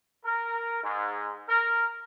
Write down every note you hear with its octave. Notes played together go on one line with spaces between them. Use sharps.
A#4
G#2
A#4